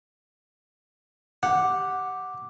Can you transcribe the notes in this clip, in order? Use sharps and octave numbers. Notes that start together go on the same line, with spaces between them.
G4 F#5